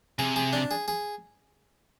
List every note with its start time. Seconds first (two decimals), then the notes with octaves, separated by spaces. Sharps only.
0.19 C3 G#4
0.36 G#4
0.53 D4
0.71 G#4
0.88 G#4